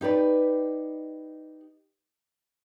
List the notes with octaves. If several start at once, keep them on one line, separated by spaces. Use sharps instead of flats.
D#4 G4 B4 D5